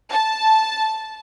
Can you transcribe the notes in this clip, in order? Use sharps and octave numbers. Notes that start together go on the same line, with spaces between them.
A5